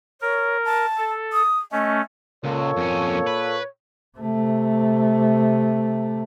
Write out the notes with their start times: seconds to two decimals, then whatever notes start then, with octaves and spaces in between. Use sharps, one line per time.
0.21 A#4 C#5
0.65 A5
0.98 A4
1.33 D#6
1.72 A3 C#4 D#5
2.44 C#2 A#2 A#3 A4 C#5
2.78 F2 C#4
3.27 B4
4.18 C3 A3